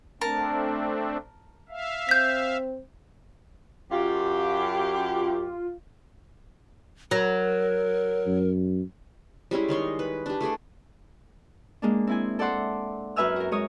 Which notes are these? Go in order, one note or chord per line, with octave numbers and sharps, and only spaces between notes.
A3 C4 D4 A#4 A5
E5 F5
C4 G6 B6
F#2 F4 G4
F#3 A#4
F#2
G3 G#3 C#4 E4
D#3 D#4 C#5 C6
B4
D4 G4
A3 G#4 A4 D5
G#3 A#3 D4
C4 E4 G#5
A4 D5 E5 F#5 C6 D6
F#2 B4 E5 G#5 E6 F6
F#4 A#4
G#3 A#4 C#5 D#6